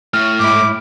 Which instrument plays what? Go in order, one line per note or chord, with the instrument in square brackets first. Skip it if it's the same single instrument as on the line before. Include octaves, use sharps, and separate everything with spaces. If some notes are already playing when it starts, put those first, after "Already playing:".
[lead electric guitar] A2 [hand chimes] F6
[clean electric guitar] G#2 E4 [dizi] D6